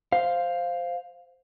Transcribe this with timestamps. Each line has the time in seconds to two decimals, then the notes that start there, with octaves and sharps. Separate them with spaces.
0.12 C5 F5